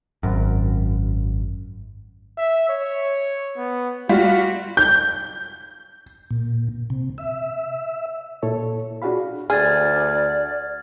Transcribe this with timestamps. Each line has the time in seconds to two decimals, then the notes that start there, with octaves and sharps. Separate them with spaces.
0.23 G#1 F#2
2.38 E5
2.69 C#5
3.57 B3
4.09 G3 F4 F#4
4.77 G6
6.31 A#2
6.90 C3
7.18 E5
8.43 A#2 E4 A4 C#5
9.02 D4 F4 F#4 G#4 F5 B5
9.50 D2 G#4 D5 F6 G#6 A6